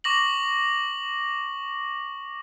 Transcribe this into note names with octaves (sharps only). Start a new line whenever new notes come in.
C#6 D6 A#6 F#7